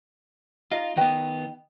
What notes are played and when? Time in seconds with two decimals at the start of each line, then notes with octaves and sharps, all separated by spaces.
0.71 D#4 F4 D#5
0.97 D#3 B3 B4 D#5 G5